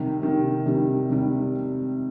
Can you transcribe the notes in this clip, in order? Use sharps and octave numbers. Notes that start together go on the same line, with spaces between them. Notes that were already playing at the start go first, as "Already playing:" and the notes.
Already playing: C3 D#3 G3
C3 D#3 G3
C3 D#3 G3
C3 D#3 G3